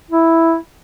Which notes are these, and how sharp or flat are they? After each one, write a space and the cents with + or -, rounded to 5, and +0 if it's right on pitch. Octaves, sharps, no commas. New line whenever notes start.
E4 +0